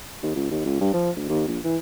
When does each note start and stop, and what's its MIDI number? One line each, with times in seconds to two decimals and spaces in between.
0.23 0.33 39
0.36 0.51 37
0.51 0.65 39
0.66 0.77 37
0.81 0.93 43
0.94 1.11 53
1.16 1.24 38
1.29 1.44 39
1.48 1.59 34
1.64 1.77 52